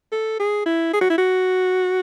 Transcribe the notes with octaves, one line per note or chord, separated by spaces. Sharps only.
A4
G#4
E4
G#4
F#4
E4
F#4